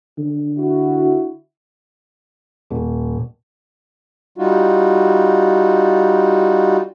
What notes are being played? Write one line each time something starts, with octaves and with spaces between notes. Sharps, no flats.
D3
E4 F#4
D#1
G3 D#4 F4 F#4